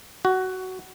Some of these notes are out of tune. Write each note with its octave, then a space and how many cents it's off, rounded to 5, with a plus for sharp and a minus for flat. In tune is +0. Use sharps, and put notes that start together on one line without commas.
F#4 +15